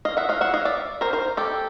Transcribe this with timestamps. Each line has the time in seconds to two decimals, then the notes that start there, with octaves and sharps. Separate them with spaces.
0.05 D#5 F5
0.17 E5 F#5
0.29 D#5 F5
0.41 E5 F#5
0.54 D#5 F5
0.65 D5 E5
1.01 A#4 C5
1.13 A#4 C5
1.37 G4 A4